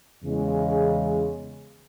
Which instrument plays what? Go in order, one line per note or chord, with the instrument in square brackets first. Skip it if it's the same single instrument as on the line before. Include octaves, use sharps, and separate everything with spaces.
[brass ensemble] E2 C#3 G#3